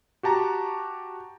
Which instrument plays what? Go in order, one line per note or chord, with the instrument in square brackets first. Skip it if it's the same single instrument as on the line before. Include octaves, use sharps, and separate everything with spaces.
[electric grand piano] F#4 G4 A5 A#5